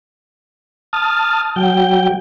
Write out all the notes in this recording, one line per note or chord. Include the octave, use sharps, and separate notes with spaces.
A5 D#6 F6
F#3 G5